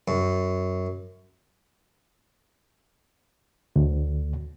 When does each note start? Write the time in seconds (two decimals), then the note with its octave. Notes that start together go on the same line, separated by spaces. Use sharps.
0.08 F#2
3.76 D2